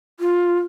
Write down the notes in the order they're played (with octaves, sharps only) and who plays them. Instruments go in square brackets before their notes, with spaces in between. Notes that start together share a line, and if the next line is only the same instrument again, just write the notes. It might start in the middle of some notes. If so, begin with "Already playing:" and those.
[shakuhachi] F4